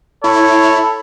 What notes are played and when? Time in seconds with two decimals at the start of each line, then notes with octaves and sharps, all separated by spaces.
0.24 E4 A4 C#5 B5